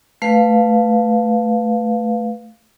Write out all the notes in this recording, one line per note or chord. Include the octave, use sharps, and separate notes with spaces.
A3 B4 F5